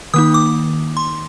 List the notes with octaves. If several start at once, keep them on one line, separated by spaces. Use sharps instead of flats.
D#3 A#3 D#4 D#6
D6
C6